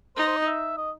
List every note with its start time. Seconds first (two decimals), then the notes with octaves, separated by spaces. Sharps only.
0.16 D#4 C5
0.26 C5
0.37 D#5
0.47 E5
0.77 D#5